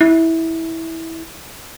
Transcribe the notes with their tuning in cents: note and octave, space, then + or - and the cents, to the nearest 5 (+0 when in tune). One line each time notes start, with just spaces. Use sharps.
E4 -15